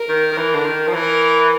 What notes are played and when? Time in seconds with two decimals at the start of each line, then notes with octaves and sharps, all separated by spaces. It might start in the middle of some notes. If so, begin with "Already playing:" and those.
Already playing: A#4
0.09 D#3
0.32 D#3
0.37 E3
0.55 D3
0.65 D#3
0.87 F3
0.93 E3 A#4